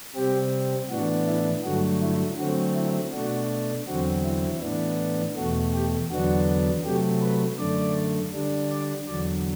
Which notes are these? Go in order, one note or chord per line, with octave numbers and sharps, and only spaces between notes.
C3 G3 C4 G4
A2 E3 B3 D4 F#4
E4
G2 D3 F#3 A3 F#4
E4
D3 F#3 A3 C4 F#4
E4
B2 A3 D4 F#4
E2 D3 F#3 C4 F#4
E4
A2 E3 B3 D4
E2 B2 A3 F#4
G4
E2 D3 F#3 B3 D4 F#4
C3 F#3 A3 G4
B4
F#2 D3 A3 D5
D3 G3 D4
D5
E2 D3 F#3 D5